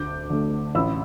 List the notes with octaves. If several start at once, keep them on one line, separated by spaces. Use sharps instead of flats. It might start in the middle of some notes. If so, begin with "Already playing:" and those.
Already playing: D2 D6 G6
D3 A3
A1 B5 E6